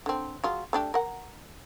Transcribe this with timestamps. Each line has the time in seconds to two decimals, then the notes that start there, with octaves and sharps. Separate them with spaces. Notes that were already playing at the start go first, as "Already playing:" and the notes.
0.06 D3 C4
0.44 F#3 F4 G#4
0.73 A3 D4 G4
0.94 A#4 F#5